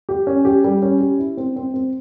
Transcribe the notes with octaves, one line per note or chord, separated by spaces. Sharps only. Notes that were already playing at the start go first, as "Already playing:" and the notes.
G4
C#4
G4
G3
C#4
G4
E4
C4
C4
C4